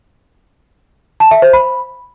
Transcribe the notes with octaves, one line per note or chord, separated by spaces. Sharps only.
A5
E5
C5
B5